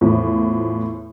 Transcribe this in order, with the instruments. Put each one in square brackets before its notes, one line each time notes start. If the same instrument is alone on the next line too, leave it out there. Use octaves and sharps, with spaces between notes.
[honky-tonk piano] E2 A2 F3